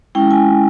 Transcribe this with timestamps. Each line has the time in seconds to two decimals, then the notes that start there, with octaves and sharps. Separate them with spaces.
0.15 G#3 C#4 E4 G5
0.31 G#5